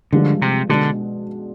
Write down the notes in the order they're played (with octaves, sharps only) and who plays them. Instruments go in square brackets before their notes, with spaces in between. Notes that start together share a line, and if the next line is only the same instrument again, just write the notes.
[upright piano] G2 F3 G#3 D4 [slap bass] D3
[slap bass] C3
[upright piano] B2 G#3 D4 [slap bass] D3